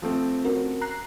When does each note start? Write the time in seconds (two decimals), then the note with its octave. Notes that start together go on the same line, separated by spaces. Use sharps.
0.02 F3 A3 C4
0.45 C#4 F#4 A#4
0.81 A#5 F#6 C7